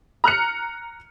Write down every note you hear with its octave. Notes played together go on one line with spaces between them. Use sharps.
A#5 F6 F#6 C#7